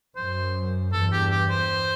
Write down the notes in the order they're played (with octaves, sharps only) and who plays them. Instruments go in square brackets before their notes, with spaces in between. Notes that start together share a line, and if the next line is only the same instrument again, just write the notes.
[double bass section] F#2 [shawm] C5
[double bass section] E2 G2 [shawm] A4
[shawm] G4
G4
C5